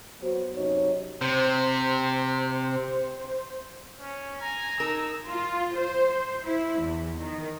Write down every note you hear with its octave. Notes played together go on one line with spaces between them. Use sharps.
F#3 B3 F#4 C5
F#2 C3 F#3 D#4 C#5
C3 C5
C#4
G#5 A#5
D#4 A#4 E6
F4
C5
E4
E2
D#3